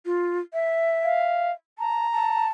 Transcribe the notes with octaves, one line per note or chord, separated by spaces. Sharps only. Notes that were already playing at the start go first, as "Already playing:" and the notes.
F4
E5
F5
A5 A#5
A5